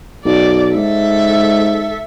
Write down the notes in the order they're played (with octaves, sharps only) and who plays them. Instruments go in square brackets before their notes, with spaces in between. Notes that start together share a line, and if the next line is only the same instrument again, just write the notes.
[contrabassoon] B1 [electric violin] D5
[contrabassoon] G#2 [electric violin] A4 E5